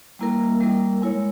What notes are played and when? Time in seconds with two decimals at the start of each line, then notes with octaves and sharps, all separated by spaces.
0.19 G3 A#3 E4 A#4
0.61 G3 A#3 E4 A#4
1.02 G#3 E4 A#4 C#5